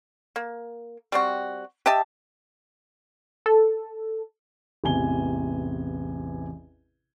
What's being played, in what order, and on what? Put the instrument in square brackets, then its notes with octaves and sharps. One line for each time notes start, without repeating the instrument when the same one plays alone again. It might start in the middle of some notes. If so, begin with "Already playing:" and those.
[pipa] A#3
G3 C4 F#4
G4 D#5 E5 A5
[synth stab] A4
[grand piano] A1 E2 C3 G#5 G7